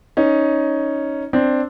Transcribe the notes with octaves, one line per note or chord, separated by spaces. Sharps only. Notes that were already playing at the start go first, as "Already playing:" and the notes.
C#4 D#4
C4 D4